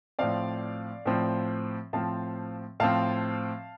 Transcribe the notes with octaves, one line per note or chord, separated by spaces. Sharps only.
A2 F3 C4 D5 F5
A2 F3 C4
A2 F3 C4 F5 A5
A2 F3 C4 F5 A5